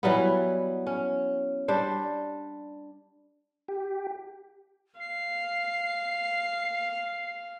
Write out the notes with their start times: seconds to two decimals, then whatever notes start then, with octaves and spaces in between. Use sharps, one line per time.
0.03 E3 F#3 G3 B3
0.87 C#4
1.68 G3 D4 C5
3.68 G4
5.00 F5 C7